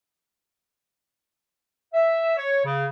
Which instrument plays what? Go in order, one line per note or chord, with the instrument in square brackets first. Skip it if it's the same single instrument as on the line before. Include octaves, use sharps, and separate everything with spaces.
[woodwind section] E5
C#5
C#3